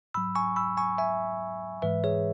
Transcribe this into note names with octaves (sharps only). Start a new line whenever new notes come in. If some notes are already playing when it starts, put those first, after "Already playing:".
G#2 F#3 B5 E6
G#5 C#6
B5 E6
G#5 C#6
E5 G#5
G#2 E3 G#3 B4 E5
G#4 C#5